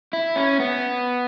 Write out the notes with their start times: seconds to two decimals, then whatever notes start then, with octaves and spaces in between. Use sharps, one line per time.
0.13 E4
0.36 C#4
0.60 B3